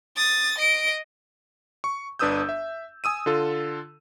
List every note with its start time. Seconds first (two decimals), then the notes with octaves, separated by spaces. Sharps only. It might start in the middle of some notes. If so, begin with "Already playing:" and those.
0.16 D#6 A6
0.58 D#5 D7
1.84 C#6
2.19 G1 D4 B4 D#6 E6 G6
2.49 E5
3.04 G#5 D#6 E6 D#7
3.26 D3 F4 A4